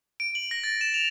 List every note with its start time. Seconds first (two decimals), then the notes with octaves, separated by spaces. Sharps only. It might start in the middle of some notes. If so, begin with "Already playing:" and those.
0.20 D7
0.35 F#7
0.51 A#6
0.64 A6
0.81 E7
0.94 F7